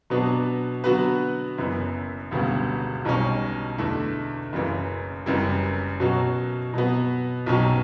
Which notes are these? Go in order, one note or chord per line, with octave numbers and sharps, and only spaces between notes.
B2 F#3 B3 D4
D3 F#3 B3 F#4 B4
F#1 F#2 E3 B3 E4
E1 D2 C#3 G3 B3
B1 B2 G3 C#4
E2 D3 A3 E4
F#1 F#2 C#3 E3
F#1 F#2 E3 G3
B2 F#3 C#4 F#4
B2 F#3 B3
B1 B2 F#3 C#4 G4